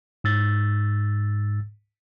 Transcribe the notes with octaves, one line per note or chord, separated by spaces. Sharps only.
G#2 E6 A6